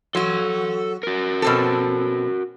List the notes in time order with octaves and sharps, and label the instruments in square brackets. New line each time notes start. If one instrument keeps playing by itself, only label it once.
[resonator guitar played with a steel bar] F#3 F#4 [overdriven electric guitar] A4 C6
[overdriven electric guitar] F#4 A#4
[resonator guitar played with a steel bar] B2 C4 A4